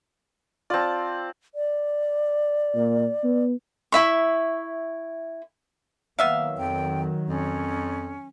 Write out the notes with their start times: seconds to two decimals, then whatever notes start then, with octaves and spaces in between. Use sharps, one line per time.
0.70 C4 F4 D5 A5
1.55 D5
2.75 A#2
3.24 B3
3.92 E4 E5 C#6
6.19 D#3 F#3 A#3 B3 E5 F5
6.58 F2 G5
7.29 F2 C#4